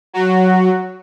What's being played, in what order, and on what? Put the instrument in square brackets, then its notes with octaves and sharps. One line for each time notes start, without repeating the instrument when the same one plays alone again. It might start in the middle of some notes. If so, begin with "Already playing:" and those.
[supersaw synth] F#3 F#4